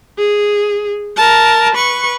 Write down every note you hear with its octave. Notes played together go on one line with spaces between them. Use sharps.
G#4
A#4 A5
B4 C#6